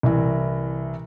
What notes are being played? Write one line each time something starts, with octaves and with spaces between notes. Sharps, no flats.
C2 E3